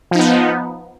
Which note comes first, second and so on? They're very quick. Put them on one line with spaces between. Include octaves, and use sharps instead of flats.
F3 D#4 B3